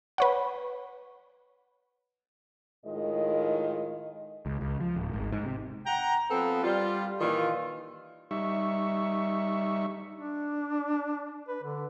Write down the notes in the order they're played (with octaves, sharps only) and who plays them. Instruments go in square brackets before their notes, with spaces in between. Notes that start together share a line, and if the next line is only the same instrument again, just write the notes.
[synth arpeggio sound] B4 C#5 F#5
[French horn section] A2 D#3 G#3 F4 D#5
[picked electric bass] C#2
C#2
F3
D1
G#1
G#2
C3
[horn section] F#5 G5 A#5
F3 B3 C4 A4 B4
G3 F4
A#2 D#3 E3 F4
[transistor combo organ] G3 D#4 E5 C#6
[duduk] D4
B4
D3